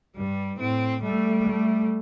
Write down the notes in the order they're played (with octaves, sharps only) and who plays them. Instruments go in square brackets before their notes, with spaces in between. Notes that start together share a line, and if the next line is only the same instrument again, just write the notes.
[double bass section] G2 [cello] G3
[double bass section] A2 [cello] C4
[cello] G3 [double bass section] A3
[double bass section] A3